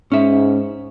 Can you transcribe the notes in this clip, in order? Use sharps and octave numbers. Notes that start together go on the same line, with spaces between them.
G#2 C#4 E5